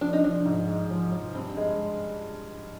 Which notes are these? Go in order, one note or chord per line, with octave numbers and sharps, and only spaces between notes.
F3 D4
D#4
F3 D4
G#2
G#3
F3
F3
G2 C4
G#3